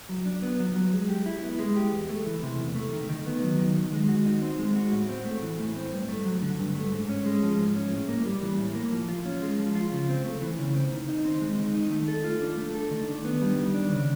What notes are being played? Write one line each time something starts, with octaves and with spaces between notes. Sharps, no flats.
F#3
D4
B3
F#3
F#3
G#3
G4
E4
B3
G#3
G4
E2
A3
E3
C3
E2
A3
D#3
D#3
B3
F#3
D#3
D#3
G#3
F#4
D#4
C4
G#3
F#4
A2
C4
A3
E3
A2
C4
G2
A3
F#3
D3
G2
A3
G#2
C#4
G#3
F3
G#2
C#4
A2
A#3
G3
E3
A2
A#3
F3
F4
C#4
G#3
F3
F4
C#3
C4
A3
E3
C#3
C4
D#3
D#4
C4
G#3
D#3
D#4
A3
A4
F4
D4
A3
A4
D#3
D4
B3
G3
D#3
D4
C#3